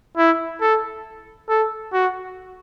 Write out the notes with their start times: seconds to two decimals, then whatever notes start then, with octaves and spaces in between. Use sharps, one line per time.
0.18 E4
0.61 A4
1.49 A4
1.93 F#4